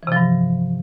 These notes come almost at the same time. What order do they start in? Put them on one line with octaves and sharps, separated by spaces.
E3 C3 F3 G2